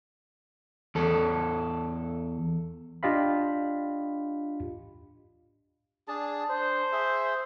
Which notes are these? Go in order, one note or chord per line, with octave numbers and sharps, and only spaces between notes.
E2 A4
D4 F4 G4 D#5 F5 B5
D4 G#4 A5
D4 C5
G#4 E5